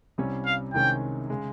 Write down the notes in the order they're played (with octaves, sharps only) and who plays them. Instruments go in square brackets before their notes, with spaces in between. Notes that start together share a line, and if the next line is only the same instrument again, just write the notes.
[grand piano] C2 C3 G3 C#4
[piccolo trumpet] F5
[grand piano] C2 C3 D#3 G#3 C#4 [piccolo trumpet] G5
[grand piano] C#3 G#3